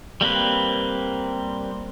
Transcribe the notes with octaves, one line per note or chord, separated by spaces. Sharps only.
G3 A#3 C4 B4